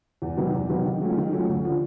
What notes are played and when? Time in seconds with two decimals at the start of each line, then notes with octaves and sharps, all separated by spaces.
0.22 E2
0.37 C3 D#3 F#3 B3
0.53 E2
0.69 C3 D#3 F#3 B3
0.85 D#3
1.01 F#3 A3 C#4 F4
1.17 D#3
1.33 F#3 A3 C#4 F4
1.49 D2
1.65 D3 F3